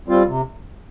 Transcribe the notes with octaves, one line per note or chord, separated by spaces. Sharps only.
G3 C4 F4
C3